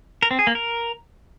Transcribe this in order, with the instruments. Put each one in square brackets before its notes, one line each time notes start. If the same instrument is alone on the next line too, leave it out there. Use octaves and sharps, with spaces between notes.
[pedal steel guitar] A#4
C4
G#4
A#3
A#4